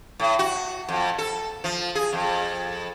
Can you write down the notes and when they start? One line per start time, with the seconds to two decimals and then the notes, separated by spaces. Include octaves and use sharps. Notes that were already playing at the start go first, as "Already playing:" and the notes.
0.19 A2
0.39 F#4
0.89 F2
1.18 A4
1.64 F3
1.95 G#4
2.13 F2